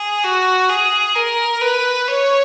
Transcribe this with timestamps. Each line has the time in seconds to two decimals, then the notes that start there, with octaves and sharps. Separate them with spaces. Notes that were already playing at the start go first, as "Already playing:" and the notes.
Already playing: G#4
0.24 F#4
0.69 G#4
1.15 A#4
1.61 B4
2.08 C#5